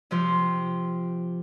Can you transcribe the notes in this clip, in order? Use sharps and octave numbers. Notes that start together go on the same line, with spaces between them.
C3 F3 C5